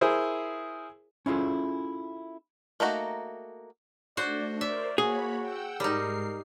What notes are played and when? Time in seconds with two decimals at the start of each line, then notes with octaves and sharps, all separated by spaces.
0.01 E4 G#4 A#4 C5
1.26 C#4 E4 F4 G#4 A4
2.80 A3 A#3 D#4 F#4
4.17 A3 D4 F#4 C5 D5
4.61 A#4 C5 D5 E5
4.98 A#3 F#4 G#4 C#5 B5
5.40 F#5 G5 E6
5.80 G#2 G3 D#4 A#4 C7